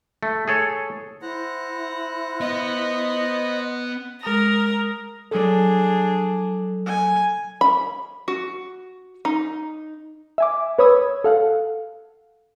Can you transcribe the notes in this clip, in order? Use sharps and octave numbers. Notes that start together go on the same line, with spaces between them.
A3
G#4 A4 C#5
E4 C5 F#5 A#5
B3 D#5
G#3 A#4 A#5 D#6
F#3 D4 G#4 A4
G#5
B5
F#4
D#4
E5 G#5 D6
B4 C#5 B5 D#6 E6 G#6
A4 F5 F#5